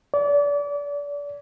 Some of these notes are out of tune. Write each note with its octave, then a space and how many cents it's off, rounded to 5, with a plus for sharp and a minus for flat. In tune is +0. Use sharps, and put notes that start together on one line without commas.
D5 -30